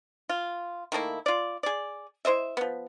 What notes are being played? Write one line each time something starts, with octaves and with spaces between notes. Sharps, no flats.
F4
D#3 A3 A#3 E4
F4 D5
G#4 D5
E4 C5 D#5 E5
F3 B3